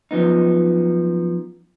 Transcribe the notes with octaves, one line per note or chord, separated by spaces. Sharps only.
F#2 F3 B3 D#4